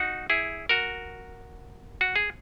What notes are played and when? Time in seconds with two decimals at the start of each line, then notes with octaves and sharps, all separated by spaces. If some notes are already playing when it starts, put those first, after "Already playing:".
Already playing: D#4 F#4
0.30 E4 G#4
0.69 F#4 A#4
2.01 F#4
2.16 G#4